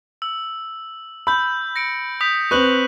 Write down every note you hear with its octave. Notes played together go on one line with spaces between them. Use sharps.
E6
B5 E6 G6
A#6 C#7 D7
D#6 G6 B6
C4 B4 C#6 F#6 F#7